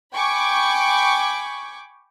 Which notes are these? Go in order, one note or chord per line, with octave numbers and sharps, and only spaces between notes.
G5 G#5 B5 C#6 D6